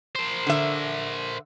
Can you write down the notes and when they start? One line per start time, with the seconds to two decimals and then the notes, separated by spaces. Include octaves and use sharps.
0.16 A#4 C5
0.47 D3 E5